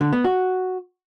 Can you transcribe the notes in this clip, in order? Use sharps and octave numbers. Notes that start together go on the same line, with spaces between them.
D3
B3
F#4